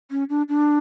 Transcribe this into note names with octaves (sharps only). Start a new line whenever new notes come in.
C#4
D4
D4